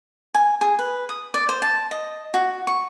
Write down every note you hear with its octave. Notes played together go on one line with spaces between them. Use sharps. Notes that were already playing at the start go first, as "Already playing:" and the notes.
G#5
G#4
B4
D#6
D5
C5
A5
D#5
F#4
C#6